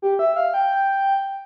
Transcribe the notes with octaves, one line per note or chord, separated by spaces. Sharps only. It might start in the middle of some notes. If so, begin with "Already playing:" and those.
G4
E5
F5
G5